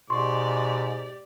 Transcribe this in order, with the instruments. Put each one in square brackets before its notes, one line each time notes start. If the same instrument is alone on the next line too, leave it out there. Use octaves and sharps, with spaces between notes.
[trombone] G#2 [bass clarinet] B2 [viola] G4 D5 [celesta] C6 C#6